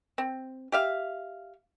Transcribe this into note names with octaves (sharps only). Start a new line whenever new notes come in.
C4
G4 E5 F5